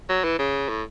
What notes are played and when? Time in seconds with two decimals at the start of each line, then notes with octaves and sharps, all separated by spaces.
0.09 F#3
0.24 E3
0.39 C#3
0.69 A2